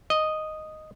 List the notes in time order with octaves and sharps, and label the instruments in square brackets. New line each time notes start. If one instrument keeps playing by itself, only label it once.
[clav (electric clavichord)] D#5